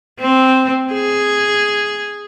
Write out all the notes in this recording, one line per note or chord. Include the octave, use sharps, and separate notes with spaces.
C4
G#4